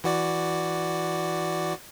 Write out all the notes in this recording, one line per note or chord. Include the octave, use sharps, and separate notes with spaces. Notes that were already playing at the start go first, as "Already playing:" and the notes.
E3 F#4 D5